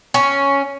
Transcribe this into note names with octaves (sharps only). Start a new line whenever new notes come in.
C#4